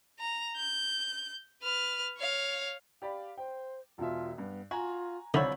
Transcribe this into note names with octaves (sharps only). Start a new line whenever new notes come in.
A#5
G6
B4 F6
C#5 F5
G4 D5 F5 B5
C5 G5
E1 B2 F4 E5
G2 B3
F4 F#4 G#5 A#5
C2 D3 F3 E4 C#5 D5 B6 F#7